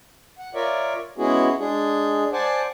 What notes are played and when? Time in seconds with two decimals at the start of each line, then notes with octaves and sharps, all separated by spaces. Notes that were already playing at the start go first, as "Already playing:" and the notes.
0.38 F#5
0.55 F4 A#4 C#5 D5 E5
1.18 G#3 B3 C#4 E4 F#4 G#4
1.59 G#3 D4 G#4
2.33 C5 D5 F#5 G#5 A5